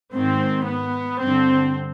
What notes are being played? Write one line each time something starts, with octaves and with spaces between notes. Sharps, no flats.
G#2 D#3 C4
B3
G2 D3 C4